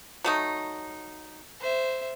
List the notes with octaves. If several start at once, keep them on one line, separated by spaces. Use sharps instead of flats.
F#3 A3 D#4
C5 E5